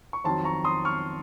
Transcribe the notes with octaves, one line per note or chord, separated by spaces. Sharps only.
C#6
F2 D#3 F#3 A5 C6
A#5 C#6
C6 D#6
C#6 F6